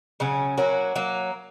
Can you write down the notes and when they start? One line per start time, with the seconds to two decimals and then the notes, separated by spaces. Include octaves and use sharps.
0.20 C#3 F#3 C#4
0.57 F#3 A#3 C#4 F#4
0.96 F#3 A#3